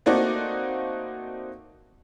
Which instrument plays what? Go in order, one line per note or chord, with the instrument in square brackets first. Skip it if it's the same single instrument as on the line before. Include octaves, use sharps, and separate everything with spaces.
[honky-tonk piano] A3 A#3 C4 D#4 F#4 D5